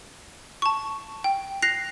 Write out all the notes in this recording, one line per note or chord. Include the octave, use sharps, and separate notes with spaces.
A5 C#6
G5
F#6 A#6 C7 F7